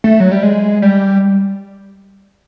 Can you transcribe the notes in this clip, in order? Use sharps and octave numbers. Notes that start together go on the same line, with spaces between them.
A3
F#3
G3
G#3
G3